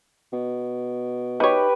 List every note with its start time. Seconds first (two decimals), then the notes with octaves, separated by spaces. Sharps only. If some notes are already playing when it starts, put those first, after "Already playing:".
0.33 B2
1.40 D#4 G4 B4 C#5